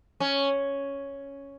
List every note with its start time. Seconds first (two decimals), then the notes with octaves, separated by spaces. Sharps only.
0.20 C#4